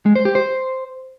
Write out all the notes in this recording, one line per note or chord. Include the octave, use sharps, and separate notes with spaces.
G#3
C5
G4
C5